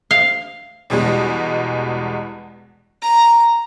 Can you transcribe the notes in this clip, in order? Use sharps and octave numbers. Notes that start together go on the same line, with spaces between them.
F5
E2 B2 G3 G#3
A#5